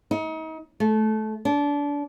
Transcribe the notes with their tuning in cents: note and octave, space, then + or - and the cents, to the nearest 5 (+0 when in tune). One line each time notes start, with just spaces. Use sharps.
D#4 +35
A3 -20
D4 -25